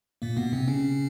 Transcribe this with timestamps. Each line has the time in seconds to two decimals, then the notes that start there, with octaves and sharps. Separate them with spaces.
0.22 A#2 A#3
0.37 B2 B3
0.53 C3 C4
0.68 C#3 C#4